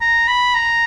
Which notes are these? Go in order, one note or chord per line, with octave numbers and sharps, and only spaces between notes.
A#5
B5
A#5